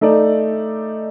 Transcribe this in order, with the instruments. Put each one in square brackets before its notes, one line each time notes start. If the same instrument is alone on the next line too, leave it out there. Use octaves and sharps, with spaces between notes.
[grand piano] A3 D#4 A4 D5